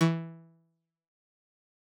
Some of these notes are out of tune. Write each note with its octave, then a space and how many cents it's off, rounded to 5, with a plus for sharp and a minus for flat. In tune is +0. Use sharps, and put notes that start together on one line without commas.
E3 +0 C#6 +25